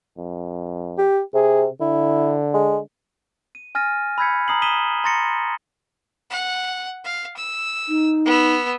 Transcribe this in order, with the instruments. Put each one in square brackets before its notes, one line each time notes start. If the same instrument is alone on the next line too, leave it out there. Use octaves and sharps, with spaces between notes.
[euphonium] F2
[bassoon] G4
[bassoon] C3 [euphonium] G#4
[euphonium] D3 [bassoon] E4
[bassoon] G#3
[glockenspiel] D#7
G#5 F6 A6 A#6 D#7
B5 E6 G6 G#6 B6 C#7
A#5 D#6 C7 F#7
D#6 B6 D#7 E7 G7
A#5 C6 A6 A#6 C#7
[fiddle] F#5
F5
E6
[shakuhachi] D#4
[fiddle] B3 E6